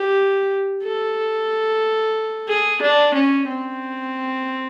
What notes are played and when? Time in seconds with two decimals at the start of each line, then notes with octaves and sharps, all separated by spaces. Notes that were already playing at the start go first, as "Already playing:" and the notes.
Already playing: G4
0.83 A4
2.49 G#4
2.82 D4
3.14 C#4
3.48 C4